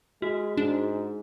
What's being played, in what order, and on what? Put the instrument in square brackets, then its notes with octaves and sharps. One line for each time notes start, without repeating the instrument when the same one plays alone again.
[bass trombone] G#3 [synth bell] F#4
[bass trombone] G#2 [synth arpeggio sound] D4